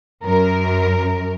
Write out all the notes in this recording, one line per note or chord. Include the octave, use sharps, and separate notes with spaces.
F#2 A#4